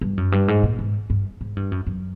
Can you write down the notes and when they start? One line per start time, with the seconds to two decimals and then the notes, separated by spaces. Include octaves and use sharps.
0.01 G2
0.17 F#2
0.32 G2
0.48 G#2
0.63 A#2
0.79 G#2
1.10 G2
1.41 G#2
1.57 G2
1.72 F#2
1.87 F#2